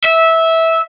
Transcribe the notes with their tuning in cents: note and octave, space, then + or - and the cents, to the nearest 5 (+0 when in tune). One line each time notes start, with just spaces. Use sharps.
E5 -15